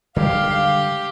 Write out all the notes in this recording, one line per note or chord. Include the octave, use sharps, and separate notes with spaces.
D3 G3 G#3 G4 F5